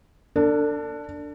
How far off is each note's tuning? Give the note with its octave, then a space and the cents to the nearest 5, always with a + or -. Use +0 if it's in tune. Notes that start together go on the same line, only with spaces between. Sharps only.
D4 +0 A4 +40